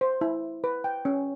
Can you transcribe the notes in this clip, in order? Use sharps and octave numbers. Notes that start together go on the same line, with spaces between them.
C5
E4
B4
G5
C#4